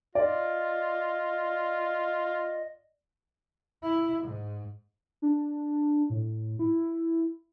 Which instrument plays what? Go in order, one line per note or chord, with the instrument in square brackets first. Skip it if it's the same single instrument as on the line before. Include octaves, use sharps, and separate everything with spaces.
[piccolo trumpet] F4 [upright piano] D5 [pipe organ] D#5
[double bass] E4
G#2
[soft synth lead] D4
A2
E4